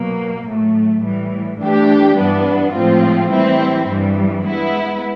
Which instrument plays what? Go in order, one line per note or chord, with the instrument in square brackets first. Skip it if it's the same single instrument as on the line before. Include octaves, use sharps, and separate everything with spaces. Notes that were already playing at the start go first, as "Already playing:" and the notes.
Already playing: [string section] B2 F#3 A#3
A2 F#3 A3
A2 E3 G3
E3 A3 D4 G4
G2 E3 G3 B3 D4
A2 F3 G#3 C4 F4
E3 G3 C4 E4
G2 E3 G3
G#3 B3 E4